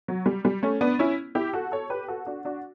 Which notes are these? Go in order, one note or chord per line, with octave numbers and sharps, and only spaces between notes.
F#3
G3
G3
A3 C#4
B3 D4
C#4 E4
E4 G4
F#4 A4
A4 C#5
G4 B4
F#4 A4
D4 F#4
D4 F#4